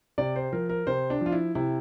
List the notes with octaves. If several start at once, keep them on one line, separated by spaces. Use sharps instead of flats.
C3 D5
C5
F3 A#4
A#4
C3 C5
D4
F3 F4
E4
C3 E4